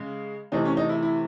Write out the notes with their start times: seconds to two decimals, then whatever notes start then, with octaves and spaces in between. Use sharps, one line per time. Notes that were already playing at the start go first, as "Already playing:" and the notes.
Already playing: C#3 G#3
0.52 C3 E3 A3 D#4
0.65 C#4
0.77 D#4
0.89 E4
1.03 E4